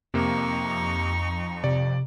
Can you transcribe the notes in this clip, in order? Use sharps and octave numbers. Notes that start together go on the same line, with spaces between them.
F2 C3 A#3 D#4 C#6
C3 D5